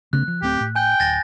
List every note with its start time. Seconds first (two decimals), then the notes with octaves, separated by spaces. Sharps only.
0.13 C#3 A3 B3 F#6
0.28 F3
0.42 D1 A3 C4 G4
0.60 A2
0.75 G5 G#5 G6
1.00 D1 A6 A#6